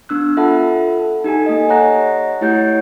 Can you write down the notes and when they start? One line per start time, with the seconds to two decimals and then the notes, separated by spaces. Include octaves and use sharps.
0.09 B3 D4 E6 F#6
0.37 F4 A4 E5 F#5 A5 B5
1.24 D#4 G4 A4 G#5
1.46 A#3 D#5
1.69 C#5 D#5 F#5 A#5 F#6 A#6
2.41 A3 E4 G4 C#5 F#5 G6